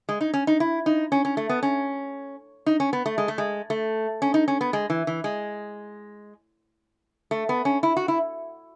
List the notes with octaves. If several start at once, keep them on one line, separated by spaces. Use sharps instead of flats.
G#3
D#4
C#4
D#4
E4
D#4
C#4
C#4
A3
B3
C#4
D#4
C#4
B3
A3
G#3
A3
G#3
A3
C#4
D#4
C#4
B3
G#3
E3
E3
G#3
A3
B3
C#4
E4
F#4
E4